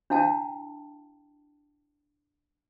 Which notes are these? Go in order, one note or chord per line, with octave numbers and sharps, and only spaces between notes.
D4 E4 F5 G5 A5